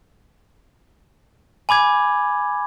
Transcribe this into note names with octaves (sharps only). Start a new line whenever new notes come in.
G#5 B5 D6 G#6